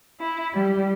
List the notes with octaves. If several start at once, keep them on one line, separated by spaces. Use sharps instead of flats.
E4
G3